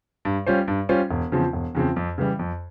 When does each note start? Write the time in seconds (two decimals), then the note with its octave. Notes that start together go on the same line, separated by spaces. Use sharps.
0.25 G2
0.47 G3 C#4 F4 C5
0.68 G2
0.89 G3 C#4 F4 C5
1.11 E1
1.32 E2 C#3 F3 C4
1.53 E1
1.75 E2 C#3 F3 C4
1.96 F2
2.18 C#3 E3 G3
2.39 F2